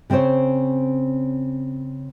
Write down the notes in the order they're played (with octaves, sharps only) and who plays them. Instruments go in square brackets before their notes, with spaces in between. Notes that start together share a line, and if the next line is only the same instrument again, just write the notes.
[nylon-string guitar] C#3 C4 C#4 C5 C#5